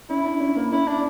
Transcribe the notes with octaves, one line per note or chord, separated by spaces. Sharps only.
C#4 E4
D4
C#4
A#3
C#4 E4
C#4 D4